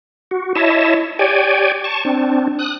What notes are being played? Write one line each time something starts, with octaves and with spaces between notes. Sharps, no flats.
F#4
E4 C#5 D#5 E5 A5
G4 C#5 D5 G5 G#5
A5 C#6
C4 D4
D#6 F#6